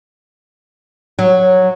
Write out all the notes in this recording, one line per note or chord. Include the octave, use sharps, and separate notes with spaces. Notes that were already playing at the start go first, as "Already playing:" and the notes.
F#3